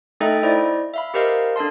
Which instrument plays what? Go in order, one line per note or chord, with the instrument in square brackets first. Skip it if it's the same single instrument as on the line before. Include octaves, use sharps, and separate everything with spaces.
[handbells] A3 D#4 A4 D#5 E5 G5
E4 C5 D5 D#5
E5 F5 B5
G4 A#4 C5 D#5 F5
D4 A4 F5 A5 C6